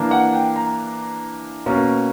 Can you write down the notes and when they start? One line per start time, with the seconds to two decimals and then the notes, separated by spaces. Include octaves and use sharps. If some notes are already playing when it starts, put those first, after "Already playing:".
Already playing: E3 A#3 D4
0.11 F#5
0.33 G5
0.56 A#5
1.66 B2 A#3 C#4